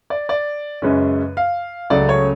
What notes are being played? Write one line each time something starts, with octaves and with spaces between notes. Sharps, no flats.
D5
D5
F#2 C#3 G#3 C#4 B4
F5
C#2 C#3 F#3 A3 D5
C#5